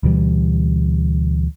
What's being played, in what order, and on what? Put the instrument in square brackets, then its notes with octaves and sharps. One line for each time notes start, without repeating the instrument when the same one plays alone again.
[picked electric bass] D2 B2 E3 G3